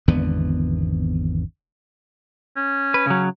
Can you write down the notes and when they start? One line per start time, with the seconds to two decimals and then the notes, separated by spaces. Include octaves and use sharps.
0.08 G#1 E2 D3 B3
2.57 C#4
2.94 B4
3.07 C#3 F#3